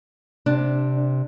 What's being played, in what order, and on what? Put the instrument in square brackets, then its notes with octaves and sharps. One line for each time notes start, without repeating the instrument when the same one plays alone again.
[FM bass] C3 [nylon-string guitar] D4